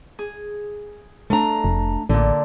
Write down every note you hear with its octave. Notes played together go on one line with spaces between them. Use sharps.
G#4
A3 D4 A#5
F1
A1 A#2 D3